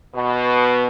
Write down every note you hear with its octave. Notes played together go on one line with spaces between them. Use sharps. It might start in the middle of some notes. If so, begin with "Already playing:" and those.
B2